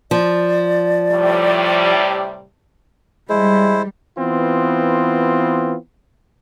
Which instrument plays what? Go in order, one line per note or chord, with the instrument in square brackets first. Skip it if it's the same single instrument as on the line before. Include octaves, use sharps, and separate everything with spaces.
[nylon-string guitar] F3 [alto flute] D5
[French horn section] A2 C3 G3
[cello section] G3 [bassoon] G#3 [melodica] E4 C5
[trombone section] E3 B3 C4 F4